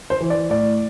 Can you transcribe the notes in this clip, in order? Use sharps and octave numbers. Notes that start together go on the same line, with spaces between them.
C5
E3
D5
A2 D5